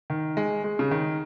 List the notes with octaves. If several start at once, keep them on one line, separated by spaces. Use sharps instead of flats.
D#3
G#3
G#3
C#3
D#3